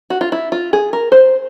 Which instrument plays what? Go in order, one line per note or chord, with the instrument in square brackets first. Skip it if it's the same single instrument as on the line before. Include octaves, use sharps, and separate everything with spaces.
[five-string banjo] F#4
F4
E4
F4
G#4
A#4
C5